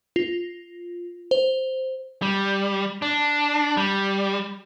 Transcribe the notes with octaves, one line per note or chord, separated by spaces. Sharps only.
F4
C5
G3
D4
G3